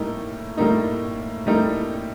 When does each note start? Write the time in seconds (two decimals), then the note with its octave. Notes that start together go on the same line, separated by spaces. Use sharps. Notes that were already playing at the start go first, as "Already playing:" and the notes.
Already playing: A2 G3 A#3 D#4
0.57 A2 G3 A#3 D#4
1.46 A2 G3 A#3 D#4